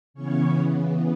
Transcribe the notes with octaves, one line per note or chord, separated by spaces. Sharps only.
C#3 E3 B3 C#4 C#5